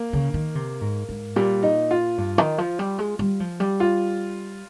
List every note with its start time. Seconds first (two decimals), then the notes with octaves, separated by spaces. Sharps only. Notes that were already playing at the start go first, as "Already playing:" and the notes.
Already playing: A#3
0.13 C#3
0.34 D#3
0.55 C3
0.81 G#2
1.09 G#2
1.36 A#2 G3
1.63 D#4
1.91 F4
2.18 G2
2.38 D#3
2.58 F3
2.79 G3
2.98 G#3
3.19 G3
3.40 F3
3.60 G3
3.80 F4